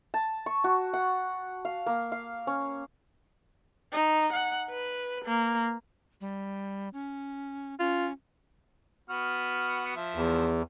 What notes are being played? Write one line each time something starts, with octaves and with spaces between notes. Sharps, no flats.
A5
C#6
F#4
F#5
F5
A#3
F5
C#4
D#4
F#5
B4
A#3
G3
C#4
C#4 F4
B3 F#4 F6
F3 E5
E2